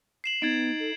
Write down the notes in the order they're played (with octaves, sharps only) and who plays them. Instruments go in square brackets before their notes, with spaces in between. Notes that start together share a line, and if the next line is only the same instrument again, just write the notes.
[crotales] C7 E7 F#7
[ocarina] B3 [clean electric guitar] D#4 [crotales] G#6 A6 D7
[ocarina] A4